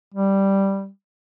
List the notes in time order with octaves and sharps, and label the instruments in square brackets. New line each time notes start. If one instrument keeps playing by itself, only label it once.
[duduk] G3